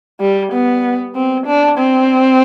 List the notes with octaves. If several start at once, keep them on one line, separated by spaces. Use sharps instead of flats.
G3
B3
C4
D4
C4